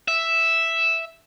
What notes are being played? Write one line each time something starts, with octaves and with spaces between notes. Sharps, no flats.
E5